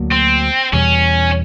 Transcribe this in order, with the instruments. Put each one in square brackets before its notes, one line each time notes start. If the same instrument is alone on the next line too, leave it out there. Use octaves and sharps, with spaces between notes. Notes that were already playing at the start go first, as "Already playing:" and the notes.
Already playing: [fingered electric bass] D2 D3 F#3 A#3
[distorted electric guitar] C4
[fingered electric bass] E2 B2 G3 [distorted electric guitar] C#4